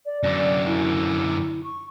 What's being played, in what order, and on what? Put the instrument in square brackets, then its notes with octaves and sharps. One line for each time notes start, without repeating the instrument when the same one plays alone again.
[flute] D5
[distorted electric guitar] F#2 D3 [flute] D5
[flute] E4
C#6